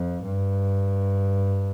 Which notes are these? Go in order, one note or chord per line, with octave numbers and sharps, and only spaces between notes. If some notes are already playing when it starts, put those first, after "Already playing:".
Already playing: F2
G2